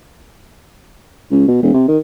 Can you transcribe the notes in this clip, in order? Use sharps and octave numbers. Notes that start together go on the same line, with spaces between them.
C#2
B2
E1
C3
D#3